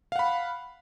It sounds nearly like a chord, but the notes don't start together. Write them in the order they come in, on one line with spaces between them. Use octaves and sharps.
F5 F#5 B5